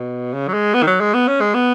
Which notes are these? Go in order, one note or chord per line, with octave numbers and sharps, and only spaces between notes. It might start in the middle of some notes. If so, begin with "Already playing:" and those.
Already playing: B2
C#3
F#3
G#3
B3
D#3
F#3
G#3
B3
C#4
G#3
B3